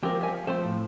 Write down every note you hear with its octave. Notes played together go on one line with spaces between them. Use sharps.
F3 G#3 C4 G4 A#4
G3 G#5
A3 C4 A4 C5
A2